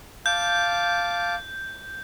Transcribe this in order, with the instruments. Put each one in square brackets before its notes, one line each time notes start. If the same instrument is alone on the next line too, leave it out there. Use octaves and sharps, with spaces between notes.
[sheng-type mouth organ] F5 A5 D6 [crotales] G6